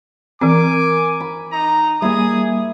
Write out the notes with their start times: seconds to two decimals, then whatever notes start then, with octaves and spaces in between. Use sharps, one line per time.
0.41 E3 C4 A#4 G#5 D6
1.20 B5
1.53 D#4 A#5
2.02 G3 A#3 E4 G#4 D5 G#5 D#6